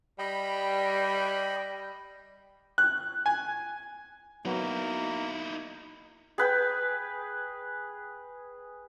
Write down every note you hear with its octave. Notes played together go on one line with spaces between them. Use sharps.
G3 D#5 G5 B5
F#6
G#5
F#3 A#3 B3 D#4 E4 F#4
G#4 B4 G5